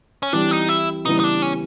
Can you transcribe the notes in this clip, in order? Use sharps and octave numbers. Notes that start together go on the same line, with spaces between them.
C#4
E3 G3 C4 D4 E4
D#4
E4
C#3 E3 G3 B3 D#4 E4
D#4
D4
C#4